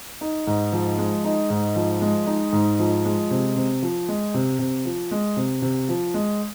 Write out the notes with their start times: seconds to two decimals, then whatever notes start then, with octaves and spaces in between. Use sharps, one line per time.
0.21 D#4
0.47 G#2
0.73 F3
0.98 G#3
1.24 D#4
1.50 G#2
1.76 F3
2.02 G#3
2.27 D#4
2.53 G#2
2.79 F3
3.05 G#3
3.31 C3
3.56 C3
3.82 F3
4.09 G#3
4.34 C3
4.59 C3
4.85 F3
5.11 G#3
5.37 C3
5.62 C3
5.89 F3
6.14 G#3